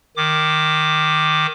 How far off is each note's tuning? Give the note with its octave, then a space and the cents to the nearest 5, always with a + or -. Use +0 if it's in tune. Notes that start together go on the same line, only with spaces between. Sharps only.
D#3 +0 D6 +10